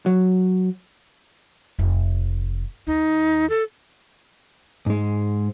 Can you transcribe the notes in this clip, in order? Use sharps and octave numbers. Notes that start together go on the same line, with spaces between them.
F#3
F1
D#2 D#4
A4
G#2 G#3